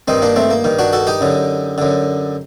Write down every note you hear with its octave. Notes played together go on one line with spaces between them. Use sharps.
G2 D#3 C4 D#4
A#3 D4
A3 C4
A#3
G2 D#3
D4 F#4
F#4 A4
D#4 G4
F#2 D3
F#2 D3